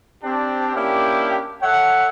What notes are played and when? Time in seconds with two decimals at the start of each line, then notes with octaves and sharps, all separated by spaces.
0.23 C4 D4 G4
0.75 A#3 C#4 D4 E4 G4
1.62 A4 C#5 E5 F#5